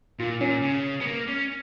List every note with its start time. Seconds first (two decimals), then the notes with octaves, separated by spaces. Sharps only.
0.19 A#2 F4
0.41 A#2 C#4
0.63 C#3
1.01 B3
1.06 A#3
1.28 C#4